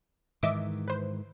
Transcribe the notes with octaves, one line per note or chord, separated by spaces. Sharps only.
G#2 D#3 E3 D#5 E5 D6
B4 C5